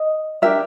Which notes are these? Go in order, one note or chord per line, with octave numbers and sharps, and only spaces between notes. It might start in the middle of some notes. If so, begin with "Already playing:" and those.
Already playing: D#5
D4 G4 A#4 E5